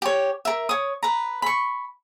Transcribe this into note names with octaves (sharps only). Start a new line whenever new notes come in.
G4 C#5
A#4 E5
C#5 D#6
B4 A#5
B5 C#6